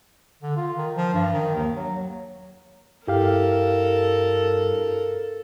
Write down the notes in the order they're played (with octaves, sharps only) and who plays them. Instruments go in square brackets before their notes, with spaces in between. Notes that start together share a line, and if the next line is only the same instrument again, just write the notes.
[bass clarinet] D3
F4
D#3
F3
G2
D#3
D#2
F#3
[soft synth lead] G2 [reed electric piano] E4 G4 F5 [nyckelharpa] A4 A#4